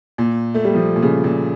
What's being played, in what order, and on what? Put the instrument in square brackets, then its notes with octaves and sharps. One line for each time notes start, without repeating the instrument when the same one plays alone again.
[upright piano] A#2
A3
G3
F3
A#2
C#3
A#2